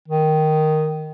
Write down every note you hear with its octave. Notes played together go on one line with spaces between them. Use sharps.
D#3